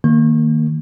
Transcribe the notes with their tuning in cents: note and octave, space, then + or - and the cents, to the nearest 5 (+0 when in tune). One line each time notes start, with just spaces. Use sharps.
D#3 +0 A#3 -15